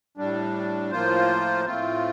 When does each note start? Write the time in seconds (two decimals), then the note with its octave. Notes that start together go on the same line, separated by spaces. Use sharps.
0.17 A2 G3 D4
0.91 A2 F3 A#3 F4 C5
1.65 A2 A3 C4 F4